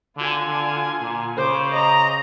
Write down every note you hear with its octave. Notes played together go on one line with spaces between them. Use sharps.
D3 F4 G#5
D3
A#2
C#3 C5 D6
D#5 A#5